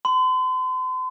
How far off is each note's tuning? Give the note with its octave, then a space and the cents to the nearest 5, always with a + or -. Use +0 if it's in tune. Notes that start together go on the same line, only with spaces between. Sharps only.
C6 -40